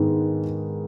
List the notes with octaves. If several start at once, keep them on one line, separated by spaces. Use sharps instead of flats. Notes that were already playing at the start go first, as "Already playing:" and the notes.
Already playing: G#2 D#3 G#3 B3